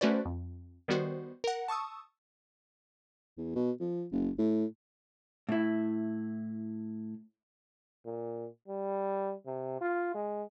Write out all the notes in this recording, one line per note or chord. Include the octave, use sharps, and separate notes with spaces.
A3 C#4 F#4 B4 C5 D5
F2
D#3 G3 B3 F#4 C5
A#4 F#5
A5 C#6 D#6 E6
E2
B2
F3
F#1
A2
A2 E4
A#2
G3
C3
F4
G#3